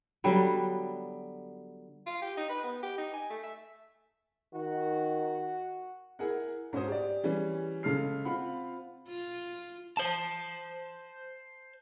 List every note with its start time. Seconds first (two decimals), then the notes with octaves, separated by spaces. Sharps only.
0.24 D3 F#3 G3 B3
2.06 F4
2.22 G4
2.37 D#4
2.49 B4
2.64 B3
2.83 G4
2.98 D#4
3.14 G#5
3.30 A3
3.44 E5
4.54 D#3 F#4
6.19 E4 G#4 A#4 F#5
6.73 G#2 C#4 F#4 C5 D#6
6.88 G4 D5
7.24 E3 G3 C#4 G#4
7.83 C#3 G#3 A4 F6 C7
8.25 C4 F4 F5 F#5 B5
9.08 F4
9.97 C5 A5